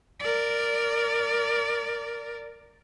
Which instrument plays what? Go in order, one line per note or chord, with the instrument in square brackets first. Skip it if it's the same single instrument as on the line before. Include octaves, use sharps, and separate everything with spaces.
[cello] A#4 D5